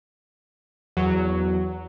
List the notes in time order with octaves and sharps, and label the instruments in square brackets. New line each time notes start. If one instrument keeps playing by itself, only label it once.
[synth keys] E2 F#3